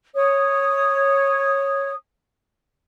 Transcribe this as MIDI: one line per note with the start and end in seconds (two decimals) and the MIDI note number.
0.14 1.93 73
0.14 1.93 87